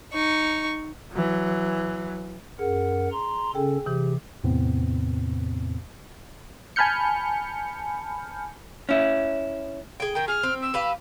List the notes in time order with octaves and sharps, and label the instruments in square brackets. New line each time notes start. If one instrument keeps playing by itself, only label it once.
[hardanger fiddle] D#4 C#6
[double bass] E3 F#3
[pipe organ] F#2 A#4 F#5 [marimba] G#4
[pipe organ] A#5 C6
[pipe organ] C#3 C#4 A4 [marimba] G#4 G5
[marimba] C3 E3 [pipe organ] G4
[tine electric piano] E2 A2 C3 B3 C4
[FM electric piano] G#5 A5 B5 F6 G6 C#7
[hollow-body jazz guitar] C#4 E4
[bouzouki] G#4 G5
[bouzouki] D#3 A#4 [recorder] G5
[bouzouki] G#4 [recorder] F6
[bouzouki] C4
[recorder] E6
[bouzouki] G4 B4 F5